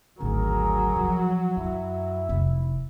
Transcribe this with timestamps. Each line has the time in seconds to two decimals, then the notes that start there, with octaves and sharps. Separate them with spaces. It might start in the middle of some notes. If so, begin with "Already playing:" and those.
0.20 G#1 D2 F#3 G#4 A#4
0.95 E3 F3
1.57 F#2 E4
2.29 F1